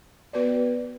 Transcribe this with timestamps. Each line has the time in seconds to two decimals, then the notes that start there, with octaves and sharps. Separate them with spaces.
0.33 B3 F#4 B4 D5